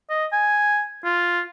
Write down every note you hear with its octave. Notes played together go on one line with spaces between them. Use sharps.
D#5
G#5
F4